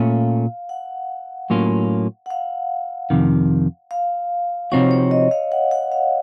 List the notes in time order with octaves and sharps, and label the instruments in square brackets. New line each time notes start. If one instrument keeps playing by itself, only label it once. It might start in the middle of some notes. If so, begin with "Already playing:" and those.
Already playing: [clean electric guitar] A#2 A3 C#4 [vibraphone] F5
[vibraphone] F#5
[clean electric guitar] A2 F#3 A#3 C#4 F4
[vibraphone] F#5
F5
[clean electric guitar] F2 C3 D#3
[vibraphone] F5
[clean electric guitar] C3 F3 C4 D#4 F#4 [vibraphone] C#5
[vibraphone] C#5
D#5
F5
F#5
F#5
F5